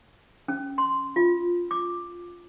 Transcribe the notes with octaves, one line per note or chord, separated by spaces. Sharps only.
C#4
C6
F4
D6